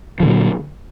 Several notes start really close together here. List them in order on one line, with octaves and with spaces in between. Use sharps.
F3 D3 A#2 F#3